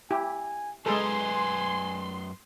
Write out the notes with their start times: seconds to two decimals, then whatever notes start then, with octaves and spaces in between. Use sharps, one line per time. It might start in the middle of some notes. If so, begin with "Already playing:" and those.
0.11 E4 G4 G#5
0.86 F#2 G#3 G#4 A4 B4 G#5 A#5 C6